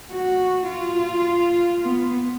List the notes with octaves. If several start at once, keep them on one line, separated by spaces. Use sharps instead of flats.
F#4
F4
B3